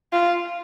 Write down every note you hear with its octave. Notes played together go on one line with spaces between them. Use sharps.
F4